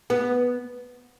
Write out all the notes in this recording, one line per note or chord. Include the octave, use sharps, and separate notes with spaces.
B3